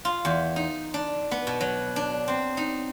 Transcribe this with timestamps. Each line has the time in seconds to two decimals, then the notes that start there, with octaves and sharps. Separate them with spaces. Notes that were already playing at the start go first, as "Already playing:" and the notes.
0.05 F4
0.25 E2
0.56 D#4
0.94 D4
1.31 B3
1.47 B2
1.61 F#3
1.96 D4
2.28 C4
2.57 D#4